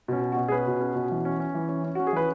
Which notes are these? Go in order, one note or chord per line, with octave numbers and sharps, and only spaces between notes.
B2 C#4
C#4
F#4
B2
G#4
C#4 B4
B2
C#4
B2
E3
C#4
C#4
E3
C#4
C#4
C#4 F#4
G#4
E3 B4